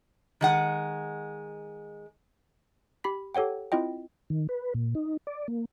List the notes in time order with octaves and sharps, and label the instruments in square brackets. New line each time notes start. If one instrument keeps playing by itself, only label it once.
[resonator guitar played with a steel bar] D#3 G#3 F#5
[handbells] G4 B5 B6
G4 A4 C#5 F#5 G5
C4 E4 F4 D#5 G5
[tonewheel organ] D#3
B4
A#2
D#4
D5
A#3